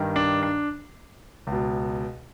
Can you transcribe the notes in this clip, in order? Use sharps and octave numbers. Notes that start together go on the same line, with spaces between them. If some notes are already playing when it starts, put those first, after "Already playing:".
Already playing: G2 D#3
D4
D4
C#2
B2